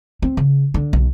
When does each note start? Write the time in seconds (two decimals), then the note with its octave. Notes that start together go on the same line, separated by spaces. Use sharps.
0.22 C4
0.37 C#3
0.74 D3
0.93 B1